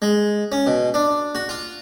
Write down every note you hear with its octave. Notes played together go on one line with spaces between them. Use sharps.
G#3
C#4
B2
D4
F#4
F4